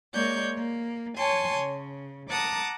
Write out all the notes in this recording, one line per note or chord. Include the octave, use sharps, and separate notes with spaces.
G#3 A#3 C#5 D5 G6
A#3
C#5 G#5 A5 C6
C#3
F#5 A5 A#5 D6 D#6